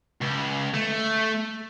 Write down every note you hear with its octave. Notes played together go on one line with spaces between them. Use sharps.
C#2
A3